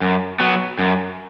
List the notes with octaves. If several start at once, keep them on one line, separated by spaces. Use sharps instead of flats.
F#2
F#3 B3
F#2